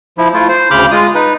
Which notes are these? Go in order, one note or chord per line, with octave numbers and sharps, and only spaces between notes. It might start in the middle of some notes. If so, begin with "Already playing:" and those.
F3 E4
A3 E4 F4
C5
D2 C#3 B5 D6 F6 G6
G#3 F4 D#6
D#4 B4